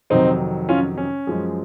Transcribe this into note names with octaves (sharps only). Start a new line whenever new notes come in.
F2 C3 D#3 F#3 C4 D#4
C#4 F4
C#4
F#2 F3 G#3